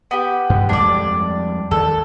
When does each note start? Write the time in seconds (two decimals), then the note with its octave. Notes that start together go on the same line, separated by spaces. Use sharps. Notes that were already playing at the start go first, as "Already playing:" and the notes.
0.11 B3 G4
0.50 G2
0.69 F2 G3 G#3 D4 D5
1.71 D#2 A4